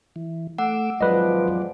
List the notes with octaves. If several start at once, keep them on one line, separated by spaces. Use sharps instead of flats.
E3
A3 F#5 D6 E6
G#1 F3 F#3 G#3 B4 D5 D#5